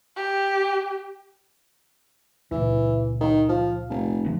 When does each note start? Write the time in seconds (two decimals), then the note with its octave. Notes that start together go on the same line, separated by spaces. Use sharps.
0.17 G4
2.51 C#2 A#2 E3
3.21 D#3
3.49 F3
3.90 F1
4.25 D#1 D2 F3